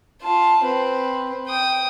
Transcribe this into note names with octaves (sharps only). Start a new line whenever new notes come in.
F4 A5
C4 B4
G5 D#6